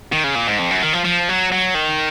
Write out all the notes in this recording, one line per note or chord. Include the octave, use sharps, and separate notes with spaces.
D#3
C#3
A#2
G#2
F2
F#2
D#3
F3
F3
F#3
F#3
D#3